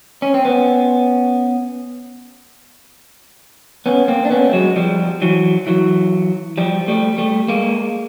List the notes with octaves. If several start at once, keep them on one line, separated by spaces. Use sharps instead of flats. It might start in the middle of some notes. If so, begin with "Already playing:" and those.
C#4
C4
B3 C#4
B3 C#4
A#3 C4
D4
B3 C#4
A3
F#3 G#3
F3 G3
E3 F#3
E3 F#3
F3 G3
G3 A3
G3 A3
G#3 A#3